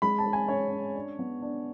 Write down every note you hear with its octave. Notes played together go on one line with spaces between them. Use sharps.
G#3 B5
A5
G#3
G#5
C#4 C#5
C#4
D4
B3
D4